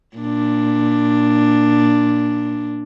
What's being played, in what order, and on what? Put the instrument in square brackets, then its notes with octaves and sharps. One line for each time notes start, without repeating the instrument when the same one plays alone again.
[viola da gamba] A#2 D4